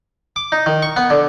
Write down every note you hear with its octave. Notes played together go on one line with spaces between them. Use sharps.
D6
D#4
D#3
C#6
B3
D3